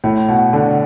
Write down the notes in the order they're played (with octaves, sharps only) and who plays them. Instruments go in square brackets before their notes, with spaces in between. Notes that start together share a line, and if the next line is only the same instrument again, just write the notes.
[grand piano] A2
B2
D3